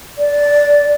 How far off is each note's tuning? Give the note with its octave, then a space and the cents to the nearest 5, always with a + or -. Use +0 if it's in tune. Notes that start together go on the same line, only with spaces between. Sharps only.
D5 -15